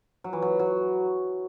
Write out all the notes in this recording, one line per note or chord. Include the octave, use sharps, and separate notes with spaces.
F#3
E3
F#3
F#3